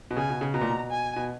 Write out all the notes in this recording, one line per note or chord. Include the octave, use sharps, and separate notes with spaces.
B2
C#3 G#5
B2
C#3
B2 A#5
A#2
B2
G#5
B2